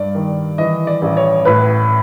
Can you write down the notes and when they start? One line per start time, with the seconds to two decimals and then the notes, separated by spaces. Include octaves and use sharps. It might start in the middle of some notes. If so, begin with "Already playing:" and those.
Already playing: G2 D5
0.15 D#3
0.58 E3 D#5
0.87 D5
1.02 A1
1.17 C#5
1.45 A2 B4